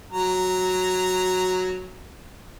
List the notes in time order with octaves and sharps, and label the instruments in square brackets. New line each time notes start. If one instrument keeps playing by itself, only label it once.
[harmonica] F#3 A#5